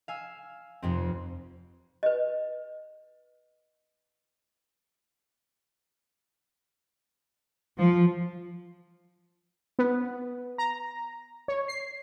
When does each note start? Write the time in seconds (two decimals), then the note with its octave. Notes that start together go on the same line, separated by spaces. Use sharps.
0.08 F5 G#5 E6
0.82 F1 F2 C4
2.03 B4 D#5
7.77 F3
9.79 B3
10.58 A#5
11.48 C#5
11.68 C7